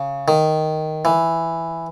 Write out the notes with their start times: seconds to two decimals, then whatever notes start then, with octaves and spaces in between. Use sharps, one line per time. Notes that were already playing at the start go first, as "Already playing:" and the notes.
Already playing: C#3
0.28 D#3
1.05 E3